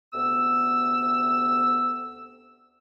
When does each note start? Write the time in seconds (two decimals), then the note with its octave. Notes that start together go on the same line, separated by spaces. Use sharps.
0.13 D2 C3 B3 E6